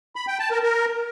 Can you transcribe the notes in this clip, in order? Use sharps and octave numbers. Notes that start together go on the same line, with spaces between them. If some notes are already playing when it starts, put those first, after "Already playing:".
B5
G5
A5
A#4
A#4